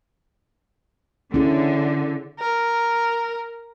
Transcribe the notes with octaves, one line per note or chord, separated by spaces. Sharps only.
D3 C#4 E4 G#4
A#4